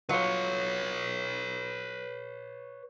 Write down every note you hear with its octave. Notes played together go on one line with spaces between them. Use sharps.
F#3 F4 B4 C#5